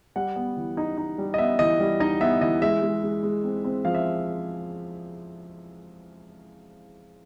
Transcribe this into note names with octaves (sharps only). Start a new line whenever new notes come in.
G3 F#5
B3
E3
D#4
D#4
G3
D#5
B3 E5
E3 D#5
G3
D#4 D#5
B3 E5
E3 D#5
G#3 E5
G#3
G#3
G#3
C4
C4
F3 F5
E5